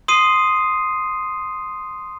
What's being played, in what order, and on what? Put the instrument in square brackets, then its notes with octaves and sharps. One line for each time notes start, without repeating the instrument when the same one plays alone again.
[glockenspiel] C6 D#6 C7 D#7